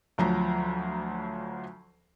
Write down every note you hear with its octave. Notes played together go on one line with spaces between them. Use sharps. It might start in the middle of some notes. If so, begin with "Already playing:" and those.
D2 F3 F#3 A#5